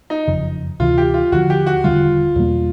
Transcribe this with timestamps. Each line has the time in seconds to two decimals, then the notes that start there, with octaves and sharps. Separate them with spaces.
0.10 D#4
0.27 F#1 F2 C#3
0.79 D2 C3 E3 F4
0.98 G4
1.14 F4
1.32 D#2 D3 F3 F#4
1.50 G4
1.67 F#4
1.84 E1 D#2 D3 G3 F4
2.36 E2 B2 G3 A#3